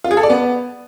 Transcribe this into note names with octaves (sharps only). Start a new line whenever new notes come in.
F4
G#4
A4
D5
B3